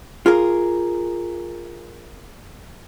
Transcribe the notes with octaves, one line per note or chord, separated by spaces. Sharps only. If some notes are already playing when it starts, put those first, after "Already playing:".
F4 G#4 A#4